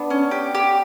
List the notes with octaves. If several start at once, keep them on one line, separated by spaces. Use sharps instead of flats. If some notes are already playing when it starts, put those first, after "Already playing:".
Already playing: B3 D4
C#4
G4
G4